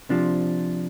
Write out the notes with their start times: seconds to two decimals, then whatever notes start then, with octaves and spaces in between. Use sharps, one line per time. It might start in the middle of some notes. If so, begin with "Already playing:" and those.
0.09 C3 F3 D4